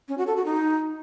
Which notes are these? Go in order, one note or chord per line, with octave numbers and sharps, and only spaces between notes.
C#4
F#4
A4
F#4
D#4